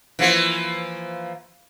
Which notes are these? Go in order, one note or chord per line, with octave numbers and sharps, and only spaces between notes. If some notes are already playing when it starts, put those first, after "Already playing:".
E3 F3 A#3